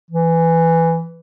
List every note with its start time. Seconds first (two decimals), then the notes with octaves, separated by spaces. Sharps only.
0.11 E3